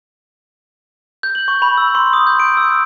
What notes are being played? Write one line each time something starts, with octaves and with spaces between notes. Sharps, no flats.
G6
F#7
C#6
B5
E6
C6
D#6
G6
D7
E6
F#6